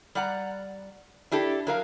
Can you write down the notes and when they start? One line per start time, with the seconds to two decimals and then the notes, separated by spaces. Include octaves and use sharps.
0.15 G3 D5 F#5 A#5
1.32 D4 E4 G4 A4
1.67 F#3 A#4 F5